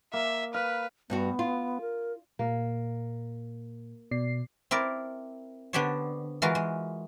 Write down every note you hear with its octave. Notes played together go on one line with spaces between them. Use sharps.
A#3 E5
B4 F5
G2 G3 B3 F#4
F4
A#4
A#2 A#3
B2 D5 C7
C4 E4 A#4 D5
D3 B3 D4 G4 C5 C#5
E3 G#3 F4 F#4 A#4
G#3